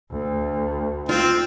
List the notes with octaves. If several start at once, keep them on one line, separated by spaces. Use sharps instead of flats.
D2
C4 F4